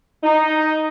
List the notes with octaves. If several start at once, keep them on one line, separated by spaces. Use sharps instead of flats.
D#4